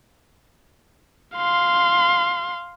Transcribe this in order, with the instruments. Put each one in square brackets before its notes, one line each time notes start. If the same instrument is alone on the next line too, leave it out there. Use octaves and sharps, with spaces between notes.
[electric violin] F5 C6